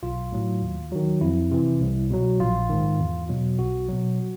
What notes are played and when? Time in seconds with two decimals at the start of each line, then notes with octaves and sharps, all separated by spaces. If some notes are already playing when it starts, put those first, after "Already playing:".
0.03 B1 F4
0.32 A2 F#3
0.62 D#2
0.92 D#3 F#3
1.21 F2 E4
1.51 C3 E3
1.81 C2
2.10 B2 F#3
2.40 A#1 F4
2.70 G#2 D#3
3.00 E2
3.29 B2 F#3
3.59 B1 F#4
3.89 B2 F#3